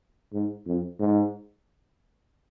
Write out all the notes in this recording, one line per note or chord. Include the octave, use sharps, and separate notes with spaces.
G#2
F2
G#2